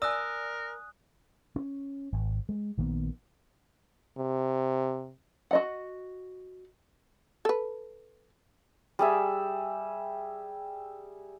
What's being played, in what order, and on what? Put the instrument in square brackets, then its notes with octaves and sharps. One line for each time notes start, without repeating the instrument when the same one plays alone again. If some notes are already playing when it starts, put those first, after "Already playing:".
[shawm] A#4 [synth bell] D5 G#5 [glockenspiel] D#6 F#6 [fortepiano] E6
[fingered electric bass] C#4
G#1
G#3
A#1 D#3 A#3 B3
[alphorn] C3
[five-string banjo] F#4 D#5 F#5
[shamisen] A4 B4
[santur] G3 G#4 E5